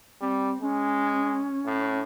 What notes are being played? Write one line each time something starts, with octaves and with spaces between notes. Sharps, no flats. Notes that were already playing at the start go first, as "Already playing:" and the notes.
G3 C4
G#3 C#4
A2